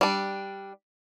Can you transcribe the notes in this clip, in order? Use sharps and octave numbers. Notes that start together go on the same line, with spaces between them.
G3 D4